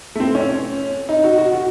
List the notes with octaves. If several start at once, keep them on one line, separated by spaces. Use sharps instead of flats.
A3
C4
C#4
D#4
F#4
F#4
F#4